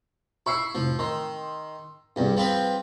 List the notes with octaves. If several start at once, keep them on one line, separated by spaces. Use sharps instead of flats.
E4 C#6 E6 C7
F1 A2 F3
D#3 C6
C2 G2 G3 G#4
F3 C4 B4